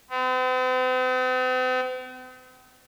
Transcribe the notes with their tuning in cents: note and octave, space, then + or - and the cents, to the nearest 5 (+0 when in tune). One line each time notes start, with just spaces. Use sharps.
C4 -45